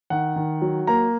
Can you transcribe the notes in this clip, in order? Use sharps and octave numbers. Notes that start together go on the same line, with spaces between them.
D#3 F#5
D#3
F#3
A#3 A#5